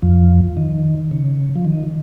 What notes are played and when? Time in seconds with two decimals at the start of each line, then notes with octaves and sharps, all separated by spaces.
0.02 F2 F3
0.57 D#3
1.11 C#3
1.56 F3
1.65 D#3